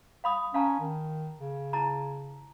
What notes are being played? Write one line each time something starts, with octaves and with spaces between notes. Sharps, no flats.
F5 B5 D#6
C#4 F5 A5 A#5
D#3
C#3
E4 A5 A#5